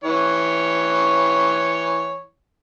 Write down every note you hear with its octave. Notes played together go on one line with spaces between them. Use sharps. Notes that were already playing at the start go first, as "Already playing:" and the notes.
E3 C#5